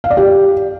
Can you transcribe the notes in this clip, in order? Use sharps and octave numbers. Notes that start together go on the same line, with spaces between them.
F5
D5
G4